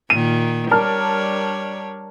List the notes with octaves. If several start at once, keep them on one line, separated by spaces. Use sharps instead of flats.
A#2 D#3 D#7
G3 D4 A#4 C#5 A5 F6